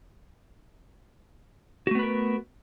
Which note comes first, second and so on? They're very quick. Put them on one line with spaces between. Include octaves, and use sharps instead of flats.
F#4 A3 B3 B4 A#4